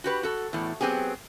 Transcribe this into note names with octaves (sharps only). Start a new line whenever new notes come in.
F#4 G4 B4
F#4 A4
E2 A2
F#3 B3 C4 G4 G#4